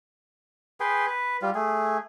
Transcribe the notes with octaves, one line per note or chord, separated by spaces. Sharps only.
G#4 B4 G5 C6
B4
G3 F4
A3 G#4